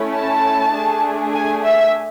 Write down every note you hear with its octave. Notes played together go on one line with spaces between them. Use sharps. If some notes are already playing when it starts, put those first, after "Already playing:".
Already playing: A3 C#4 E4
A5
A3 D4 G#4
G#5
E5